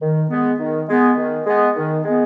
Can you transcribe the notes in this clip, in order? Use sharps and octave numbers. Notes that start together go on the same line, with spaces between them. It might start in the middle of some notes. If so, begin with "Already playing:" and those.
D#3
G#3 B3
D#3
G#3 B3
D#3
G#3 B3
D#3
G#3 B3